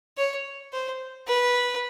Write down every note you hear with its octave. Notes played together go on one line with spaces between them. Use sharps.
C#5
C5
B4